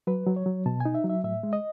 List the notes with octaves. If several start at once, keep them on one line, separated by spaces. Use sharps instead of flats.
F#3 B4
F#3
C#5
F#3
B2 A5
D#4 G#5
E5
F#3
E5
A2 E5
G#3
D#5